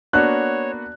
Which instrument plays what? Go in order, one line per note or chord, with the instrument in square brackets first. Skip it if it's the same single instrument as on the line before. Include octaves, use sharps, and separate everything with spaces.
[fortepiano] A#3 B3 F#4 [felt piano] D4 [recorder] C#5 [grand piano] F#6